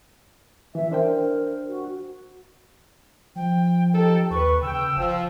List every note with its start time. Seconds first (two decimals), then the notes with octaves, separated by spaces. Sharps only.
0.75 E3 E5
0.91 D4 A#4 C5 G5
1.69 F#4
3.36 F3 G5
3.92 D#4 G4 A4 G5
4.31 D#2 B4 C#6
4.62 C#3 G5 E6
4.96 F1 F3